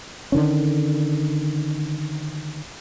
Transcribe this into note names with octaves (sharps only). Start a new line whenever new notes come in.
D3 D#3 C#4